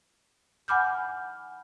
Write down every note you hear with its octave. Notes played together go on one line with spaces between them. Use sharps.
F#5 G#5 B5 D6 F6 G6